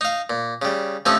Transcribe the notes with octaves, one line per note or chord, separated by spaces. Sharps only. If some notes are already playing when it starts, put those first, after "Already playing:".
D#4 F5
A#2
C#3 G3
C3 F3 A3 C#4 D#4 A4